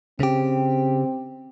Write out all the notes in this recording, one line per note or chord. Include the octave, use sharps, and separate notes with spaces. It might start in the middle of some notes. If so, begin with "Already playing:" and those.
C#3 C4 G4